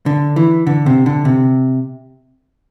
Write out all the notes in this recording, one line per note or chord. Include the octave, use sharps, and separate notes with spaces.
D3
E3
D3
C3
D3
C3